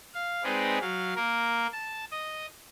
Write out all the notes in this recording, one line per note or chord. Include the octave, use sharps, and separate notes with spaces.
F5
G#3 C4 D#4 G#4 B4 D5
F#3 F5
A#3 A#4
A5
D#5